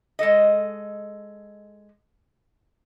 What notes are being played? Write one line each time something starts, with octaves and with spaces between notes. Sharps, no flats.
G#3 A4 D#5